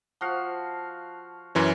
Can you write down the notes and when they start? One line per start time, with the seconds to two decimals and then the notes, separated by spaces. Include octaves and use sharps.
0.21 F3 F#4 F5
1.55 F#2 E3 C#4